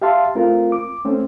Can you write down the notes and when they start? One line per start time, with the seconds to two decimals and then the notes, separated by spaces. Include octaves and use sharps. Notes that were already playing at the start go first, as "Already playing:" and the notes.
0.02 G4 E5 F5 A5 C6
0.35 A3 C4 F4 A#4
0.72 D6
1.05 A3 C4 C#4